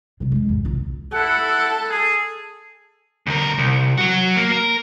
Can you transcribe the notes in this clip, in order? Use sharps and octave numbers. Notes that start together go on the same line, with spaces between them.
C3 G3
E1 G#3
E2 G#2
C2 F4
E4 A4 F#5
G#4
D2 A#4
C2
F#3 F#4
A#3
A#4